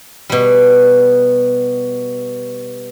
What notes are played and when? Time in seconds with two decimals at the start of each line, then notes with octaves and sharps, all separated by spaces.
0.30 B2 G3